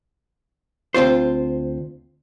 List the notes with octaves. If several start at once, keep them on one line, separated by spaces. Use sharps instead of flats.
D2 C4 F4 C5